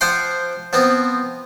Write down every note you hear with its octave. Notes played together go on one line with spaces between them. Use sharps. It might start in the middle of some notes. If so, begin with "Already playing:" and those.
F3 C5 F#5 G5 C6
F3 B3 C4